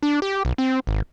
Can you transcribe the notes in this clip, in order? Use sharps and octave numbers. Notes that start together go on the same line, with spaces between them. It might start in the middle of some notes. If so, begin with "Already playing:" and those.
D4
G4
B1
C4
G#1